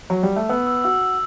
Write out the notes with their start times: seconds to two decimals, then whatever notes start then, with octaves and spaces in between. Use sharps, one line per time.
0.10 F#3
0.23 G3
0.36 A3
0.49 B3 E6
0.67 E6
0.84 F#4 E6
1.02 E6